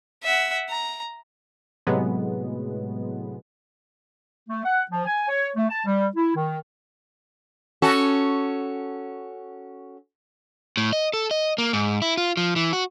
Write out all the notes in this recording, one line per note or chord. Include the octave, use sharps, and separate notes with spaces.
E5 F#5
A#5
A2 C3 F#3 G#3 B3
A3
F#5
F3
G#5
C#5
A3
A5
G3
E4
D#3
C#4 F#4 A4
A2
D#5
A4
D#5
A#3
G#2
E4
F4
F3
E3
F#4